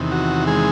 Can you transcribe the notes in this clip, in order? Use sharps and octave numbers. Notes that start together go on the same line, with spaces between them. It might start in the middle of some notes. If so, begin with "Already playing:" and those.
Already playing: E2 C3 D#3
F#4
G#3 G#4